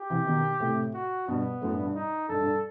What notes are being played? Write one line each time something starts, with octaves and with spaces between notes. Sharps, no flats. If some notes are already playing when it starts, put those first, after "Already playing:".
Already playing: G4
C3 E3
B2 D#3
A2 C3
F#4
G2 B2 B3
F#2 A2
G2
G2
D#4
G2 A4
G2